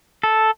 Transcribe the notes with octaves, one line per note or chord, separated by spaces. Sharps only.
A4